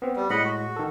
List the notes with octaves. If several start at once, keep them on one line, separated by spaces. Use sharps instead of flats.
B3 C4
G3
A2 G#3 D#5 F#5 B5
F#4
D#3 A4